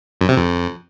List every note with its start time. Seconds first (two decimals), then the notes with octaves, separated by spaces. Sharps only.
0.21 F#2
0.29 C3
0.37 F2